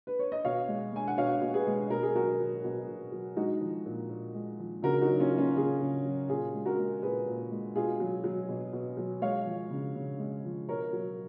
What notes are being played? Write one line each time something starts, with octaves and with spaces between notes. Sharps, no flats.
B4
C#5
D#5
B2 C#5 F5
G#3
G#3 G#5
F#5
B2 C#5 F5
B2
G#4 B4
G#3
B2 A#4
G#4
F#3 F#4 A#4
F#3
B2
B2
F#3
G#3 D#4 F#4
F3
A#2
A#2
G#3
F3
C#3 F#4 A#4
D#4 F#4
F#3
C#4 F4
F#3
C#4 F4
C#3 F4 G#4
C#3
F#3
A#2 F4 G#4
G#3
F#4 A#4
G#3
A#2 G#4 B4
A#2
G#3
B2 F4 G#4
F#3
F#3
B2
B2
F#3
G#3 C#5 F5
F3
C#3
C#3
G#3
F3
B2 A#4 C#5
F#3